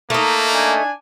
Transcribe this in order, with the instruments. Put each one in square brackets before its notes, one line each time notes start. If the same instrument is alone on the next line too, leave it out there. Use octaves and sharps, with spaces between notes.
[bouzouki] A3 D#4 [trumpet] A#3
[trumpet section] D4 G#5